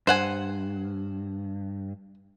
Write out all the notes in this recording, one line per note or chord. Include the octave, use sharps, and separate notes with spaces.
G2 C5 F#5 G#5